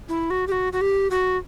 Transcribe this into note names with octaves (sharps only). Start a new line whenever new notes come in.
E4
F#4
G4
F#4
F#4
G4
F#4